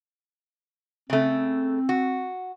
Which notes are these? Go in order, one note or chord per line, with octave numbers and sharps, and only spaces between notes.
C#3 A3 C4
F#4